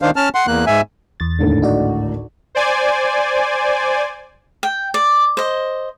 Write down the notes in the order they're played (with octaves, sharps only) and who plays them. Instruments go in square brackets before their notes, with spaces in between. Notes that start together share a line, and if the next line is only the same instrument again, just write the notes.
[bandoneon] D#3 D4 C5 F5
C#4 A5 F6
F#5 C6
E2 A#3 F#6
G#2 E5 G#5
[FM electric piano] E2 A6
[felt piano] G#1 D2 A2
[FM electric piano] D#4 F#4 D5
[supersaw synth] C5 D5 G#5
[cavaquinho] G5
D5
C5 D#5